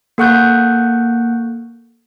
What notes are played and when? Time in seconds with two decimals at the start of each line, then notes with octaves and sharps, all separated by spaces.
0.18 A#3 A4 F#5 C#6 F#6 G6